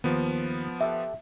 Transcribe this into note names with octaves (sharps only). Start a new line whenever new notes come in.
D#2 D#3 F3 B3
G4 A4 E5 F#5